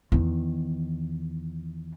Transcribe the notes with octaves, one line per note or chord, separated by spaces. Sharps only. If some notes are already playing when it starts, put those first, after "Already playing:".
E2 D#3